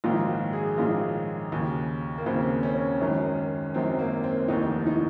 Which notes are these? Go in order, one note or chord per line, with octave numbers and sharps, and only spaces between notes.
A#1 G#2 D#3 F#3 F4
F#4
G#4
A#1 G#2 D#3 F#3 F4
D#2 C#3 F#3
A#3
D#2 C#3 F#3 C4
C#4
G#1 F#2 D#3 F#3
G#1 F#2 D#3 F#3 C4
A#3
C4
F1 D#2 D#3 D#4
D#4